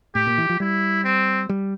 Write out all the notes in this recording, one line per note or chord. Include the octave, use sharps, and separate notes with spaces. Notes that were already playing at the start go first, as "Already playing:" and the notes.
A2 G4
A#2
E3
F3
G3 E4
C4
G3